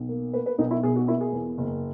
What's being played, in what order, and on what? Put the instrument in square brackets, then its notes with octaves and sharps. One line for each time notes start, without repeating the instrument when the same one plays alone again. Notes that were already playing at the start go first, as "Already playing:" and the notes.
Already playing: [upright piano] B1
A#3
A#3 B4
B4
B1 D#4
E4
B2 G#4
F#4
A#3 E4
G#4
E2
F#1